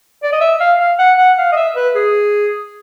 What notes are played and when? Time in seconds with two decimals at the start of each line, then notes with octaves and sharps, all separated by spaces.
0.23 D5
0.32 D#5
0.41 E5
0.60 F5
0.80 F5
0.99 F#5
1.18 F#5
1.38 F5
1.52 D#5
1.57 E5
1.76 B4
1.95 G#4